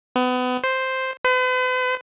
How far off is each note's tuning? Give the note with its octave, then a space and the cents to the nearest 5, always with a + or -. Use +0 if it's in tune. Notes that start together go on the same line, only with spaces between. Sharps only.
B3 +30
C5 +0
B4 +45